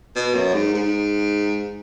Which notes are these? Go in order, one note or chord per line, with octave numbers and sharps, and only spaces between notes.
B2
F#2
G#2
G#2